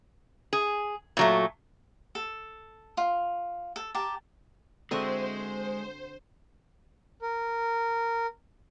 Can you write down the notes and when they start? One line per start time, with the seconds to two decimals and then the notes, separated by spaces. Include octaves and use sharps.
0.53 G#4
1.17 A#2 F#3 A3
2.15 A4
2.97 F4
3.76 A4
3.95 G4 A#4 A5
4.91 D3 G#3 C4 F#4 C5 D#5 E5
7.21 A#4